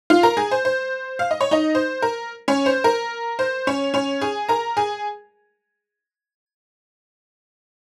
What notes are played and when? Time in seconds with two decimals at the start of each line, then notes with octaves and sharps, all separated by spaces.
0.10 F4 F5
0.23 A#4 A#5
0.37 G#4 G#5
0.51 C5
0.65 C5
1.19 F5
1.31 D#5
1.41 C#5
1.51 D#4 D#5
1.75 C5
2.02 A#4
2.48 C#4 C#5
2.66 C5
2.84 A#4
3.39 C5
3.67 C#4 C#5
3.94 C#4 C#5
4.21 G#4 G#5
4.49 A#4 A#5
4.77 G#4 G#5